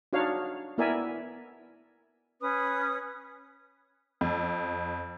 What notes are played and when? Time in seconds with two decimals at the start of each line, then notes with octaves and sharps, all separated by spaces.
0.13 D4 D#4 F#4 C#5 F5
0.78 B3 E4 A#4 D5 E5 G#5
2.42 C#4 B4 D#6
4.21 F2